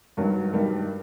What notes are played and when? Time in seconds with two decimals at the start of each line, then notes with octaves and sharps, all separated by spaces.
0.17 G2 D#3 F#3
0.53 G2 D#3 G3